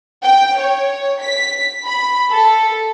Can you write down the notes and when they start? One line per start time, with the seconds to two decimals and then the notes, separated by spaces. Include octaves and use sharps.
0.24 G5
0.59 C#5
1.22 B6
1.87 B5
2.32 A4